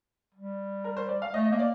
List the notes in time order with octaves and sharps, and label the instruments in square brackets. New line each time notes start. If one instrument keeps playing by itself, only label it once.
[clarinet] G3
[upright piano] A#4
C5
D5
F5
[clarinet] A3 [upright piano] D#5
[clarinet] A#3 [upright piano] D#5
[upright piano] D5